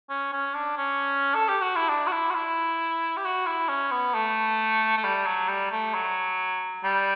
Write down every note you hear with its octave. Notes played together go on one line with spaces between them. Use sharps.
C#4
C#4
D4
C#4
A4
G4
F#4
E4
D4
F#4
E4
F#4
E4
G4
F#4
E4
C#4
B3
A3
A3
G3
F#3
G3
A3
F#3
G3